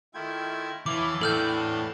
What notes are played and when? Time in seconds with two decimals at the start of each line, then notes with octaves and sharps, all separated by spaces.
0.14 D#3 A3 E4 F4 G5 G#6
0.86 E2 E3 E4 C#5 F5 A5 B5 D6
1.21 A2 D4 A4 G5 F6 G6